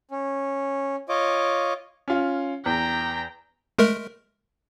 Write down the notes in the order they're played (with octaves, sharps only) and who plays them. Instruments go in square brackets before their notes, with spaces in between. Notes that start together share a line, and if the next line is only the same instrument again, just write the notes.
[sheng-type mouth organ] C#4
F4 C#5 D#5 D6
[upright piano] C#4 F4
[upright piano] E2 [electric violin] G5 A#5
[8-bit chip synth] G#3 A3 A#4